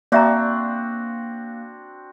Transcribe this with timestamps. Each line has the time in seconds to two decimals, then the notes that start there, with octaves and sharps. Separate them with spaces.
0.12 A#3 C4 D4 F#4 D5 E5 A#5